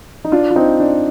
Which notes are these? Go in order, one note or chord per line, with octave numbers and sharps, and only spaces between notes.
D#4
D4 F4
F4
C4 D#4
D4